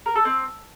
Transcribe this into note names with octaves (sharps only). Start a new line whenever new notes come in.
A#4
A4
C4